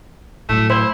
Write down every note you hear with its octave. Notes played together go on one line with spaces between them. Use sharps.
A2 F#3 A3
E4 C5